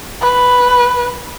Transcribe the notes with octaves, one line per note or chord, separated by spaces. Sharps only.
B4